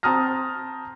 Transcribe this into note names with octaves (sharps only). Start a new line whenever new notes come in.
C4 A5 A#5 D#6 F6 A#6